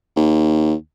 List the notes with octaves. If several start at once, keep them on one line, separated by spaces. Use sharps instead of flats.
D#2